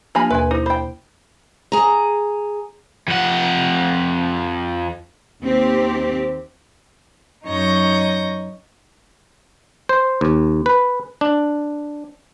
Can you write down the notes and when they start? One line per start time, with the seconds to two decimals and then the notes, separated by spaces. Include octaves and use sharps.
0.15 F3 A#3 D4 G4 G#5 B5
0.30 D#2 B2 B4 G#5
0.51 D#4 E4 C5
0.66 C5 G5 B5
1.72 G#4 A#5
3.08 F2 F#5
5.42 D#2 C4 G4
7.47 F#2 D#4 C#5 C#6 G6 A#6
9.89 C5
10.21 D#2
10.66 B4
11.21 D4